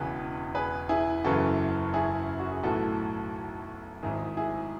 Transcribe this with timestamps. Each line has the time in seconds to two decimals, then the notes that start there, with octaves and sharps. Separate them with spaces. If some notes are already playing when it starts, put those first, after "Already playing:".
Already playing: E1 E2 C#3 E3 G#4 B4
0.55 G#4 B4
0.89 E4 G#4
1.24 F#1 F#2 C#3 E3 F#4 A4
1.94 E4 G#4
2.39 F#4
2.52 G#4
2.63 B1 A2 E3 F#4 A4
4.03 G#1 G#2 D#3 E4 G#4
4.37 E4 G#4